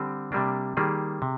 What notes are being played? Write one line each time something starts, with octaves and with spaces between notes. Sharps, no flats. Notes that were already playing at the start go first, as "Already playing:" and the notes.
Already playing: D3 G3 C4
C3 G3 A#3 D4
D#3 G3 A#3 G#4
C3